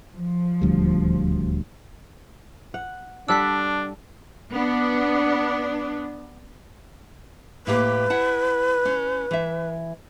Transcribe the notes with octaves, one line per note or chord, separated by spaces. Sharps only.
F3
D#1 D2 G3
F#5
G3 D4 A4 F#5 E6 F#6 B6
B3 D4
A2 A#3 G4 B4
E4 F#5 A5
C#4
E3 E5